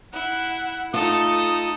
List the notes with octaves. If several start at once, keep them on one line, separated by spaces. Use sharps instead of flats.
E4 F#5
A3 D#4 F4 A4 D#6